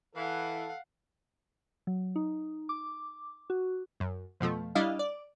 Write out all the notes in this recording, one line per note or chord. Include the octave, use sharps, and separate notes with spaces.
E3 A4 F5 F#5
F#3
D#4
D6
F#4
F#2
F2 B2 F3 A3
G3 D4 E4 D#5 F5
D5